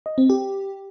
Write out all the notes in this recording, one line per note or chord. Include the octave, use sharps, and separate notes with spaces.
D#5
C4
G4